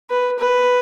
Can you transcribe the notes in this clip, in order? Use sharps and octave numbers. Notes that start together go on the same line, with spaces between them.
B4
B4